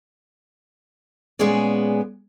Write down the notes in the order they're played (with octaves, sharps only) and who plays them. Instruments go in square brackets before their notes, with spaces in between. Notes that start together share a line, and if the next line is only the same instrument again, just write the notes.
[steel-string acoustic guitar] A#2 G#3 B3 C#4 G#4 D5